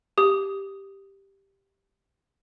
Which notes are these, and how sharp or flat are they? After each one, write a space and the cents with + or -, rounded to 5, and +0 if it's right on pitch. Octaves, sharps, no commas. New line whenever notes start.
G4 +0 D#6 +0